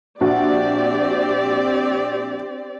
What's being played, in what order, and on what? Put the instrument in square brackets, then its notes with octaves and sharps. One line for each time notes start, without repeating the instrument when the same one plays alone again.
[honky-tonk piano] A#1 F#4 F#5 [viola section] C4 G4 D5